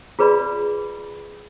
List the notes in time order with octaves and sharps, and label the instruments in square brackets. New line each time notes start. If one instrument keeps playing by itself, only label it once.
[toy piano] F4 G#4 B4 D5 B5